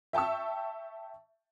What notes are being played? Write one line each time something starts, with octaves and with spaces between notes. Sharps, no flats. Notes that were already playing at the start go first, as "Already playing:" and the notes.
E5 G5 A5 C#6 E6